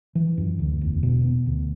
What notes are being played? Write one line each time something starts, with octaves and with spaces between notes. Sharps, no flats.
E3
F#2
D2
E1
B2
B3
D2